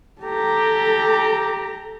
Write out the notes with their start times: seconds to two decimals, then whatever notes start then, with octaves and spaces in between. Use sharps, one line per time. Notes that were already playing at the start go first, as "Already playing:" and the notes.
0.22 G4 A4 A#5